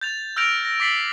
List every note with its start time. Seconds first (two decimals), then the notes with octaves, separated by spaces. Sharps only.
0.01 G6 A6 F7
0.36 E6 F6 G6 A#6 D7 F7
0.65 A#6
0.80 D6 A6 B6 C7 F#7